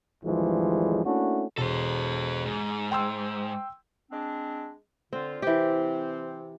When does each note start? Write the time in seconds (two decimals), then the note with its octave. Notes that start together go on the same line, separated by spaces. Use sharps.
0.24 G#1 D2 E3 F3 G3 G#3
1.05 A3 A#3 C#4 D4 E4 F#4
1.57 E1 A4 C5
2.46 G#2
2.91 G5 C6 E6
4.11 G#3 C4 D4
5.13 D3 C4 F4
5.42 C3 E3 C4 G4 C5